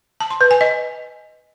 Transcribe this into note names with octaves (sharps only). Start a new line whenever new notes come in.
A5
C6
B4
G#5
D#5